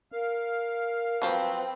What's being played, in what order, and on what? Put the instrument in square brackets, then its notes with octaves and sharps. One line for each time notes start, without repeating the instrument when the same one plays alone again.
[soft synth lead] A#4 [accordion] F5
[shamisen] F3 F#3 [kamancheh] C4 B4